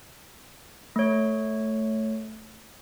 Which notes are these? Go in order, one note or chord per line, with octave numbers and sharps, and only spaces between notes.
A3 C#5